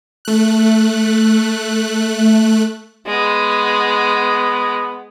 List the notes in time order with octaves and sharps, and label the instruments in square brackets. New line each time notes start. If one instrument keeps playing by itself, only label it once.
[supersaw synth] A3 F#6
[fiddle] G#3 [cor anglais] B3